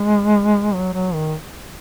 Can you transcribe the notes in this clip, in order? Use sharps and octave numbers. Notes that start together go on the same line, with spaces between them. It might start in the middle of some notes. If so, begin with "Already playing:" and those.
Already playing: G#3
F#3
F#3
D#3